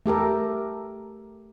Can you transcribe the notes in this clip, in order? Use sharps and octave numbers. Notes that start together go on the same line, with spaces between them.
A3 G4 A4 A#4